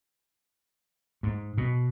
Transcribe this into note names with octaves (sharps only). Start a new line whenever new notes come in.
G#2
B2